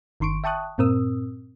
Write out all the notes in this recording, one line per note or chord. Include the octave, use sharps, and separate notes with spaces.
G1 D#3 C6 C#6 D7
E5 G5 A5 C#6 D#6 F#6
G2 A#2 C4 A#4 D#6 E6